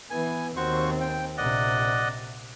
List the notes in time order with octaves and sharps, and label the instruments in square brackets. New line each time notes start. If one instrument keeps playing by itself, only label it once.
[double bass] E3 B3 [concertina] G#5
[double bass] D#2 C4 [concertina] F#4 C5 C#6
[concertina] G5
[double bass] A#1 C3 [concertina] D5 D#5 F#5